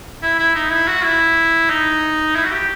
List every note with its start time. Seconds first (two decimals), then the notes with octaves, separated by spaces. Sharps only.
0.22 E4
0.39 E4
0.55 D#4
0.72 E4
0.88 F#4
1.04 E4
1.70 D#4
2.35 E4
2.45 F#4
2.51 G4